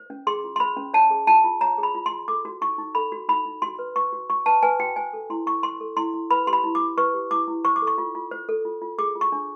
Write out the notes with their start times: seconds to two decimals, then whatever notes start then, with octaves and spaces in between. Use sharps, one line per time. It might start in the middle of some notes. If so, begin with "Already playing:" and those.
Already playing: C5
0.10 C#4
0.27 G#4 C6
0.44 F4
0.56 C6
0.60 C5 B5
0.77 C#4
0.94 C#5 A5
1.11 G#4
1.27 F4 A5
1.44 F4
1.61 C#5 A#5
1.78 G#4
1.83 B5
1.95 F4
2.06 C6
2.11 F4
2.28 A4 D6
2.45 F#4
2.61 D#4 C#6
2.78 D#4
2.95 A4 B5
3.12 F#4
3.28 D#4 B5
3.45 D#4
3.62 F#4 C6
3.79 B4
3.96 B4 C#6
4.13 F#4
4.30 F#4 C#6
4.46 B4 A5
4.63 B4 G#5
4.80 F#4 G5
4.96 C5 G#5
5.13 A4
5.30 E4 C6
5.46 E4 C#6
5.63 C5 C6
5.80 A4
5.97 E4 C6
6.14 E4
6.31 B4 B5
6.47 G4 C6
6.53 B5
6.64 E4
6.75 D6
6.81 E4
6.98 B4 C#6
7.14 G4
7.31 E4 D6
7.48 E4
7.65 C5 C#6
7.76 D6
7.82 A4
7.87 C#6
7.98 F4
8.15 F4
8.31 C5
8.49 A4
8.65 F4
8.82 F4
8.98 G#4 D6
9.15 F4
9.21 C#6
9.32 D4